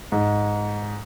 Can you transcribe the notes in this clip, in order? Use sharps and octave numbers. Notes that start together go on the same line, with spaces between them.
G#2